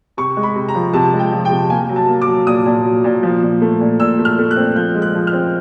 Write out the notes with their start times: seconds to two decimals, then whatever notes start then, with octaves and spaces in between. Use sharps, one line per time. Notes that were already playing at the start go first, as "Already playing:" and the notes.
0.17 C3 C#6
0.37 G#3
0.43 B5
0.56 C3
0.69 A#5
0.75 F3
0.93 C3 A5
1.13 G#3
1.19 G5
1.32 F3
1.45 G5
1.51 C3
1.70 A#3 G#5
1.89 F#3
1.96 A5
2.09 A#3
2.22 D6
2.28 F#3
2.47 A#2 D#6
2.66 A#2
2.85 F#3
3.04 A#2
3.23 F3
3.42 A#2
3.62 A3
3.80 A#2
4.00 A#2 E6
4.19 A3
4.25 F6
4.38 A3
4.51 F#6
4.56 C4
4.76 F3 G6
4.95 G#3
5.02 F#6
5.14 F3
5.27 F6
5.33 C4